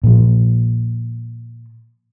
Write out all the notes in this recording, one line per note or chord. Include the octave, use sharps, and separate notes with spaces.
A#2 F3